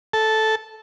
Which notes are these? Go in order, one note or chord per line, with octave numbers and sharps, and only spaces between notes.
A4 A5